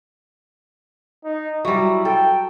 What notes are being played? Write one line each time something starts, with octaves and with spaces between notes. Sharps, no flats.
D#4
F#3 G3 E4
A4 G5